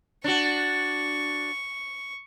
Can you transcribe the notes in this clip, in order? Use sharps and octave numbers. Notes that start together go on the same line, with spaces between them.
D4 F#4 C#6